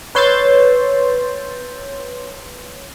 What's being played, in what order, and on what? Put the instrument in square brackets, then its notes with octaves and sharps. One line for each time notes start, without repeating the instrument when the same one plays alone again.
[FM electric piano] B4 C#5 C6 E6 G6 A6